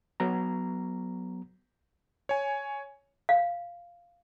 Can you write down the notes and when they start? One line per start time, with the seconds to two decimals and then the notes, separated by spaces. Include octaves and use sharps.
0.20 F#3 B3 A#5
2.29 C#5 G#5
3.29 F5